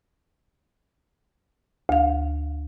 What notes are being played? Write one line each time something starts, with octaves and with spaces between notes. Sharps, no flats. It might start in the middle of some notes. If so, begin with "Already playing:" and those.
D2 F5